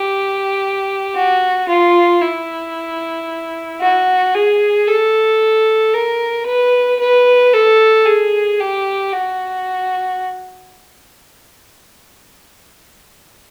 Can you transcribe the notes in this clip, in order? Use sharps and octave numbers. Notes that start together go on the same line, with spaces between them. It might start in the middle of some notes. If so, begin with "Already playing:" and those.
Already playing: G4
F#4
F4
E4
F#4
G#4
A4
A#4
B4
B4
A4
G#4
G4
F#4